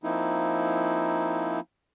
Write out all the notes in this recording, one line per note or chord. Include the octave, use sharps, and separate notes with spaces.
F3 A#3 C4 D#4 E4